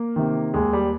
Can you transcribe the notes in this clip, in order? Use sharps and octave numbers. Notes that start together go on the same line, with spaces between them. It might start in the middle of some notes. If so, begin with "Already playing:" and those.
Already playing: A#3
C3 D#3
D#2 G#3
G3